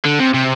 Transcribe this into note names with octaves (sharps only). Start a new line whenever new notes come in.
D3
C3
C3